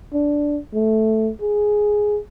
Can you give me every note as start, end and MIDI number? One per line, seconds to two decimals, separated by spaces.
0.13 0.58 62
0.74 1.30 57
1.41 2.19 68